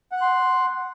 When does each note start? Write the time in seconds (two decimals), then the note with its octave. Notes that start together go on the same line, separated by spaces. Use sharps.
0.12 F#5
0.17 F#6
0.22 C6